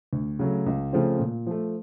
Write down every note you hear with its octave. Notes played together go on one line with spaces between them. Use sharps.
D2
C#3 F#3 A3
C#2
C#3 F3 A3 C4
A#2
F3 A3